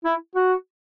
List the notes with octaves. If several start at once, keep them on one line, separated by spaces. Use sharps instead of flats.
E4
F#4